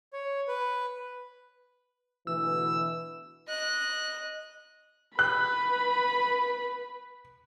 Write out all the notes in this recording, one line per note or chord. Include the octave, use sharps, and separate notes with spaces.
C#5
B4
D2 B2 E3 E6
D#5 F#6
B4 B5 F#6